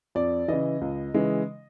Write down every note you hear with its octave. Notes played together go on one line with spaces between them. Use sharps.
F2 D5
C#3 E3 D#5
C#2
C#3 E3 G#3